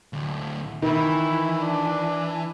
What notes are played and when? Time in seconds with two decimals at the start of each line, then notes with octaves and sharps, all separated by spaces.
0.13 D2 A2
0.82 D#3 E3 E4
1.60 D4